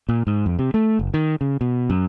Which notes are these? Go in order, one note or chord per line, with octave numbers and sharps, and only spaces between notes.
A#2
G#2
F2
C3
A3
F#1
D#3
C#3
B2
F#2